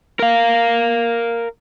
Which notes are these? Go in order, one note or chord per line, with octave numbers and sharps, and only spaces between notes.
A#4 F5